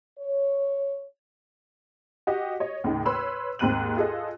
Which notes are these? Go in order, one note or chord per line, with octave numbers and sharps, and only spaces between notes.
C#5
F#4 G4 D#5
C#5 D#5
D#2 A2 C#3 D#4
B4 C#5 B5 C6 E6
D#2 G#2 C4 F#6 D#7 F#7
F4 G#4 A4 D#5